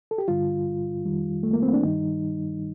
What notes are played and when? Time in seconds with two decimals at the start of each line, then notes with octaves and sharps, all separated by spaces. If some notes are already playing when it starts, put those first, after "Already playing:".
0.11 A4
0.18 G4
0.28 G2 D3 G3 F4
1.05 F2 D#3 G3
1.43 A3
1.53 A#3
1.63 C4
1.73 D4
1.83 G2 D#3 G3 D#4